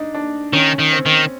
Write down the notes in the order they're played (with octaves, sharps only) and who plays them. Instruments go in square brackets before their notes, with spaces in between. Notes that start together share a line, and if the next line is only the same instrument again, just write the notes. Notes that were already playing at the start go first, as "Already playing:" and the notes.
Already playing: [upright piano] D4 D#4
D4
[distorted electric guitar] D#3 [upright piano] C#4
[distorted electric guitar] D#3
[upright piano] C4
[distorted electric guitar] D#3